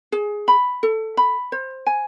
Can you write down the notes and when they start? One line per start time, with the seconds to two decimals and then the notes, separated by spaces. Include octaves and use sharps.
0.12 G#4
0.48 B5
0.83 A4
1.17 B5
1.52 C5
1.86 G#5